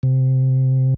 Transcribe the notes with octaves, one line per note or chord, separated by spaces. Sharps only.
C3